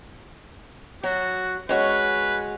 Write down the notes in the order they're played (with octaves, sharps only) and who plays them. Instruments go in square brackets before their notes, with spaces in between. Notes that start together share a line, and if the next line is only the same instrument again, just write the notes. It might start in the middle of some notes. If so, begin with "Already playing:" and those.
[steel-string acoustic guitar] F#3 [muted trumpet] F#4
[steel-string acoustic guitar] G#3 C#4 F#4 [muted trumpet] B4